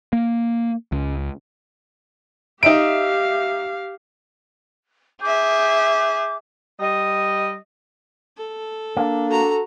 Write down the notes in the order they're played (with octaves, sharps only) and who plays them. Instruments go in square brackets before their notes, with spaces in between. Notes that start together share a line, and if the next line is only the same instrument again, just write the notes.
[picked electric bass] A#3
C#2
[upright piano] D#4 E5 D7 [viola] G4 F5
[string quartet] G#4 E5 [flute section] D6 G6
[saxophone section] G3 D#5
[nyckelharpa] A4
[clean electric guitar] A#3 [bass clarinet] D4
[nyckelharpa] F#4 A#5 [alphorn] A4